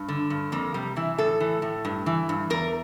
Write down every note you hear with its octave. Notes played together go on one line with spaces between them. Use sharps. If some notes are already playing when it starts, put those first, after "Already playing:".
Already playing: G2
D3
G2
F2 A#3
C3 G3
E3 E4
A2 A4
E3
A2
G2
E3
G2
E2 A#4